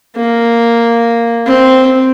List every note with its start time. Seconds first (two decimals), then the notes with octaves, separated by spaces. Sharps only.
0.16 A#3
1.46 C4